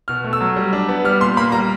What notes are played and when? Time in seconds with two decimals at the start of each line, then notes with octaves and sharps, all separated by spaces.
0.08 B2 F6
0.24 A3
0.33 E6
0.41 F#3
0.56 G3
0.73 D4
0.89 B3
1.04 G3 F6
1.21 A#2 C6
1.37 A#3 B5
1.52 G3 A#5